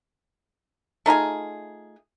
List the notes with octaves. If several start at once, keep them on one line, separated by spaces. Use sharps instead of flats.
A3 D#4 F4 G#4